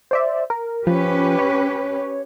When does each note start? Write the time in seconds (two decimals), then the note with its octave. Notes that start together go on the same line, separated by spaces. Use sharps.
0.11 C5 D5 E5
0.50 A#4
0.87 F3 C#4 G4 B4
1.39 C#5